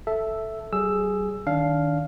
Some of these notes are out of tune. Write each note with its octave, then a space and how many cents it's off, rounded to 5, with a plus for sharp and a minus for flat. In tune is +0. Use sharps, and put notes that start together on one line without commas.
A4 +0 E5 +0
G3 -40 G#4 +5 E6 +10
D#3 +0 D4 -30 F5 +0